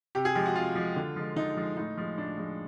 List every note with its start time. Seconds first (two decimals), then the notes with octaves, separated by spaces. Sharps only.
0.15 C3 G4
0.25 G#4
0.35 F3 G#3 G4
0.46 F#4
0.55 C3 F4
0.75 F3 G#3
0.96 D3
1.16 F3 G#3
1.36 D3 D#4
1.57 F3 G#3
1.77 A2 D#4
1.97 F3 G#3
2.18 A2 D4
2.38 F3 G#3